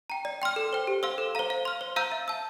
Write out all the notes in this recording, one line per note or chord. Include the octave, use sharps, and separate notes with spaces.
G5 A#5
D5
G5 C6 F6
A4
C5 G5
G4
C5 F5 C6 E6
A4
C5 F5 A#5
F5
C6 F6
C5
F5 A#5 E6 G6
E5
A5 E6